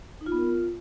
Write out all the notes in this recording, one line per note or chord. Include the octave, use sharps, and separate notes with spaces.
D#4
F4
B3
A#4
F4